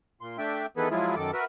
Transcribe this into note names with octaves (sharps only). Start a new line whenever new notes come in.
A#2 C6
A3 D4 E5 G5
D#3 E3 B3 G#4 A4 B4
F3 F#3 G#3 E4 F4 G#4
F#2 D#3 A4 D6
F#4 A#4 B4 E5